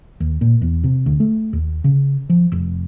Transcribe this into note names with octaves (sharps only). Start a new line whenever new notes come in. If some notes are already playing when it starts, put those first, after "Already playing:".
D#2
A#2
E2
C3
D2
A3
D#2
C#3
F3
F1